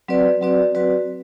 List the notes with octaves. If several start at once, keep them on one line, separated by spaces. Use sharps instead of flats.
F#3 C4 F#4 B4 D5
F#3 C4 F#4 B4 D5
F#3 C4 F#4 B4 D5